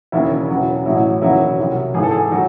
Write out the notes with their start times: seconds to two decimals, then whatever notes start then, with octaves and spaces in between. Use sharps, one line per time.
0.12 E1 D#2 C#3 E4
0.48 E1 E2 C#3 F#3
0.85 A1 A2 F#3 E4
1.21 E1 D#2 C#3 F#3 E4
1.58 C2 C3 F#3
1.94 G#1 G#2 E3 G#4
2.03 A4
2.11 G#4
2.31 D#3 F#3